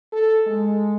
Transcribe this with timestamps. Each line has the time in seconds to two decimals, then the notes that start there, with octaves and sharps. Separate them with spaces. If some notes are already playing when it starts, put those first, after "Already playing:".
0.13 A4
0.47 G#3